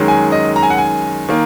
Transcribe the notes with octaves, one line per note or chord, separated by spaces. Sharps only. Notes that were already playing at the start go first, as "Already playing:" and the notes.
Already playing: F#2 D#3 G#3
G#5
D#5
A#5
G#5
F#5
G#5
D#3 A#3